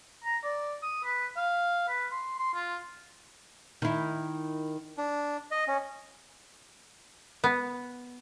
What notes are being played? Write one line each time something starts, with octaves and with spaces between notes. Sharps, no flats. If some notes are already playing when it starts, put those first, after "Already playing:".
A#5
D5
D#6
B4
F5
B4
C6
C6
F4
D#3 E4
D4
D#5
C#4
B3